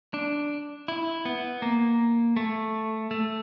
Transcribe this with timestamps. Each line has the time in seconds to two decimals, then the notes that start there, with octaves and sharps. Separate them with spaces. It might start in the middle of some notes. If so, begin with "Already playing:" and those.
0.14 D4
0.88 E4
1.25 B3
1.62 A#3
2.36 A3
3.11 A3